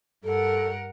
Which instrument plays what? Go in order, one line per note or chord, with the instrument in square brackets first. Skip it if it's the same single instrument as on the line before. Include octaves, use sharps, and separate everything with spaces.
[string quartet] G2 A#4 F#5 [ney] A4